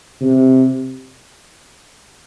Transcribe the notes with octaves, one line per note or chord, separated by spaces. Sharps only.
C3